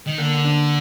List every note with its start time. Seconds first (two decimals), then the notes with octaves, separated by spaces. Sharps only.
0.06 D#3
0.18 D3 A#3
0.45 D4